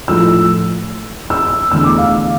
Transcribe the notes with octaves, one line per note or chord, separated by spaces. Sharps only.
A2 F3 A3 E6
E6
E2 D3 A3 E6
D6
F5